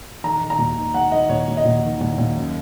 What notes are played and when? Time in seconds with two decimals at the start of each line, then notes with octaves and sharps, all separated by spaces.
0.24 D#3 A#5
0.41 D#3
0.50 A#5
0.59 D#2
0.76 D#3
0.94 D#3 F#5
1.12 D#3 D#5
1.29 D#2 C#5
1.48 D#2
1.57 D#5
1.65 D#2
1.84 D#3
2.01 D#2
2.18 D#2
2.36 F#2